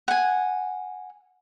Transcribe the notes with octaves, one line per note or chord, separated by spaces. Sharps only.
F#5 G#5